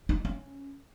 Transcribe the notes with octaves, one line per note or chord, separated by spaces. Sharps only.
D#4
C#4